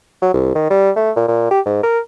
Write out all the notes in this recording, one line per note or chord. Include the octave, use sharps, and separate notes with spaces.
F#3
C2
D#3
G3
A3
A#2
A#2
G4
G#2
A#4